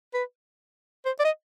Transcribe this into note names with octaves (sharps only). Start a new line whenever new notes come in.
B4
C5
D5
D#5